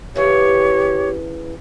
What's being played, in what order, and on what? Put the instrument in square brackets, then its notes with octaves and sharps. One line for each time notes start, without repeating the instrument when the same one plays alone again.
[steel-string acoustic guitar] C#3 E3 [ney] G4 [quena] C#5